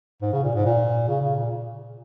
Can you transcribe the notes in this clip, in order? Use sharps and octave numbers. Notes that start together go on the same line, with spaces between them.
G#2
C#3
A#2
G#2
A#2
C#3
C#3
A#2